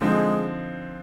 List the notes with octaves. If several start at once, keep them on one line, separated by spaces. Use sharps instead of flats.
D3 F3 G#3 C4 D#4